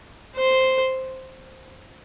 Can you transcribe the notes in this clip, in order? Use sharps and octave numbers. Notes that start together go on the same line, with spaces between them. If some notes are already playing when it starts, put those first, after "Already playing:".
C5